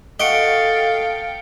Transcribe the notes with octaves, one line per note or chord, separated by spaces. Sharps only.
F#4 A4 D#5 F5 G5 C#7 D7 G7